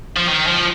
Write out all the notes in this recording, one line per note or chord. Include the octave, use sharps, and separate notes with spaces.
F3
D#3
F3